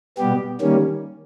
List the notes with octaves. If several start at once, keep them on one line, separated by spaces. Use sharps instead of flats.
B2 G3 B3 G4
D#3 G3 A#3 C#4